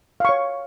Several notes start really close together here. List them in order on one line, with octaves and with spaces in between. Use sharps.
F5 C#6 C#5